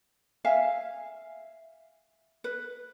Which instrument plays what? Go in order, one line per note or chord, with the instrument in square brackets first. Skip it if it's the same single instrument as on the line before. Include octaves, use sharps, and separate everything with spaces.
[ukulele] E5 F5 G#5
B4